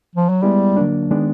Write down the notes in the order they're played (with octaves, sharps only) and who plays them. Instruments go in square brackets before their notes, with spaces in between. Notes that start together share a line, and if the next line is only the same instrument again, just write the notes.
[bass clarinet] F3
F#3
[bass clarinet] G3 [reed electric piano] G#3 B3 E4 G4
[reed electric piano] D3 F#3 A#3 D4
D#3 G#3 B3 D4